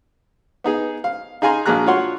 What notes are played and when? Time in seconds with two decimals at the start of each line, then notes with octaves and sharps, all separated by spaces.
0.64 B3 D#4 G#4
1.04 F5
1.42 D#4 G#4 F5 G#5 A#5 C6
1.66 A#1 F#3 A#3 G#4 A#5 F#6
1.86 F4 F#4 C#5 F#5 C6